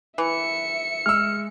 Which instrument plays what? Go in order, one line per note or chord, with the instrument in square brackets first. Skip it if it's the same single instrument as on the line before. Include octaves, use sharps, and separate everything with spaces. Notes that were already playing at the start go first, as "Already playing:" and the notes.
[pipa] E3 [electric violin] E5 C#7
[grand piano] G#3 E6 [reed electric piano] F6